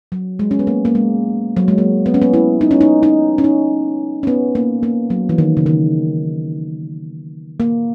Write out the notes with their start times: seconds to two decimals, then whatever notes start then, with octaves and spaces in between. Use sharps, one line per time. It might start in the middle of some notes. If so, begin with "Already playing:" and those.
0.12 F#3
0.39 G#3
0.51 C#4
0.59 B3
0.67 A#3
0.85 A#3
0.95 G#3
1.56 F#3
1.68 G#3
1.78 A#3
2.06 B3
2.14 C#4
2.22 B3
2.33 E4
2.61 D#4
2.71 C#4
2.81 D#4
3.03 D#4
3.38 C#4
3.44 D#4
4.23 C#4
4.27 B3
4.55 A#3
4.83 A#3
5.10 F#3
5.29 E3
5.38 D#3
5.57 C#3
5.66 D#3
7.60 A#3